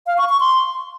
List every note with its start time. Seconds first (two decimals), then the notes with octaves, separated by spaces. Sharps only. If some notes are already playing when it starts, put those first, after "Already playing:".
0.07 F5
0.18 C#6
0.29 C#6
0.40 C6